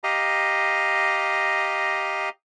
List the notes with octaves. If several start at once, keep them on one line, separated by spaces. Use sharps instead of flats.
G4 D#5 F5 A#5